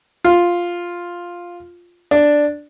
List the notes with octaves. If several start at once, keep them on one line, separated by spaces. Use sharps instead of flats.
F4
D4